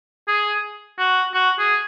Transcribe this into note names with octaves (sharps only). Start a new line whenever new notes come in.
G#4
F#4
F#4
G#4